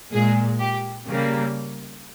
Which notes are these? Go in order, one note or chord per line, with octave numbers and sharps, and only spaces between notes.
A#2 G#3 G#4
G4
C#3 G3 A#3